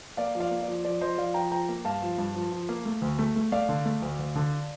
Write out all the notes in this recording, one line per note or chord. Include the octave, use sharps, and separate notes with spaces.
A#3 D5 F5
F3
D5 F5
A#3
D5
F3
F3 D5
F3 C5 D#5
F3 D5 F5
F3 G5 A#5
F3 G5 A#5
A#3
G2 F5 A5
F3
G2
F3
F3
A#3
A3
D2
A3
A3
A3 D5 F5
D3
A3
D2
D2
D3